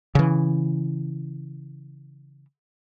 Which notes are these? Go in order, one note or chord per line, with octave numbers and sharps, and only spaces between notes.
C#3 E3